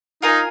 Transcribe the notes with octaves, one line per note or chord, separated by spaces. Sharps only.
D#4 F4 A#4 F5 G#5